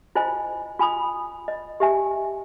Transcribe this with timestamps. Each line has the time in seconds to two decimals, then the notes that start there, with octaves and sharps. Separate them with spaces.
0.15 E4 F4 C5 D#5 G#5
0.79 F4 G#5 B5 D#6
1.48 D#5
1.80 G4 E5 G#5